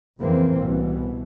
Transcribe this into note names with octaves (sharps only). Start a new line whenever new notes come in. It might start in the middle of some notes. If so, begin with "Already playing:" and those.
F2 A2 C#3 E3 A#3 C4
C2 B2 E3